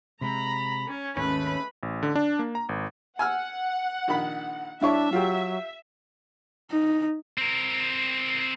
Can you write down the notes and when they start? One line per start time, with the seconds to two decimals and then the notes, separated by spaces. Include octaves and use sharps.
0.21 C3 G#3 A#5 B5
0.88 C#4
1.17 G#1 D#2 G#3 A3 C#4 B4 B5
1.83 A1
2.03 D3
2.15 D4
2.39 A#3
2.55 A#5
2.69 G#1
3.19 F#5 G#5 E6 F6
4.08 A#1 D#3 B5
4.81 G2 D4 E4 C#5 E5
5.13 F#3 F4 G4
6.71 D#4
7.38 C4 A#4